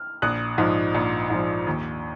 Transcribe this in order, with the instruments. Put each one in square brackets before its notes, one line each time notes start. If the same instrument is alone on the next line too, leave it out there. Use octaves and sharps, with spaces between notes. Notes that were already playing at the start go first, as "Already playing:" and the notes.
Already playing: [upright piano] F6
A#1 D#6 F#6
G#2 F3
A#1
G#2 F3
D#2